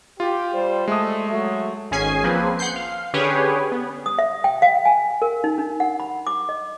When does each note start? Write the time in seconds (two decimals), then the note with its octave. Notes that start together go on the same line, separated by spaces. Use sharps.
0.20 F4 G4
0.54 G3 C5
0.88 G#3 A3 D#6
1.30 F#3 A3
1.91 G#1 C#4 G#4 G#5 C7
2.24 F3 A#3 C4 G#4 B4
2.59 F#5 C6 G6 C7
2.76 F5
3.14 D3 C#4 G4 G#4 B4 C#5
3.72 B3
4.06 D#6
4.19 E5
4.44 G5
4.62 F5
4.85 G#5
5.22 A#4
5.44 D#4
5.58 D4
5.80 F#5
6.00 B5
6.27 D6
6.49 D#5